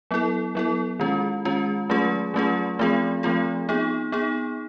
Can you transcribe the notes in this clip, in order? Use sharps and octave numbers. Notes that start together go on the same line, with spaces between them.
F#3 B3 E4 A4
F#3 B3 E4 A4
D#3 G#3 C#4 F4
D#3 G#3 C#4 F4
F#3 A3 C#4 F4 G#4
F#3 A3 C#4 F4 G#4
F3 A3 C4 F4 G#4
F3 A3 C4 F4 G#4
B3 D#4 G#4
B3 D#4 G#4